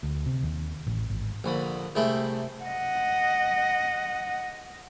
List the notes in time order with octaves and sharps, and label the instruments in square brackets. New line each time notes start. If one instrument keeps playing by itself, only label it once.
[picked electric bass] D2
C3
D#2
A1
G#1
[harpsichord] A#1 D3 B5
C2 A3 E4 G#4 G5 B5
[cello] D#5 F#5